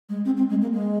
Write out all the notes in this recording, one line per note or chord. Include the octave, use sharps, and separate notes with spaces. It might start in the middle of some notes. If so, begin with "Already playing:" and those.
G#3
C4
C4
G#3
A#3
G#3